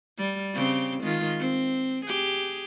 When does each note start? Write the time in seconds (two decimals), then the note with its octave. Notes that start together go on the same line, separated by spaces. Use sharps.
0.18 G3
0.54 C#3 C4 G4
1.03 D#3 G#3 F4
1.39 C4
2.06 G4 G#4